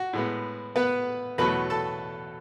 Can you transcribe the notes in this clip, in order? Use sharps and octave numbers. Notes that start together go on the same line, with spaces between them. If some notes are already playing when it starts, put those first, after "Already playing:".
Already playing: F#4
A2 G#3 B3
B3 B4
E2 B2 F#3 A3 B4 B5
A4 A5